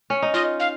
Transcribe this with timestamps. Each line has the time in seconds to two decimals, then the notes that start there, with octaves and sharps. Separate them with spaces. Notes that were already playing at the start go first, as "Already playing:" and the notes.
0.10 C#4
0.22 D#4
0.34 F4 D#5
0.60 F5